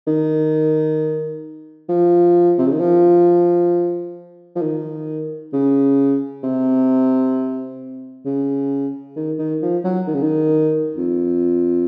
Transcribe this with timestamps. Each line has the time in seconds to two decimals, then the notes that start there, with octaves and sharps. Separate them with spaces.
0.07 D#3
1.89 F3
2.58 C3
2.66 C#3
2.73 D#3
2.80 F3
4.56 F3
4.62 D#3
5.53 C#3
6.43 C3
8.25 C#3
9.16 D#3
9.39 D#3
9.62 F3
9.84 F#3
10.07 D#3
10.15 C#3
10.23 D#3
10.97 F2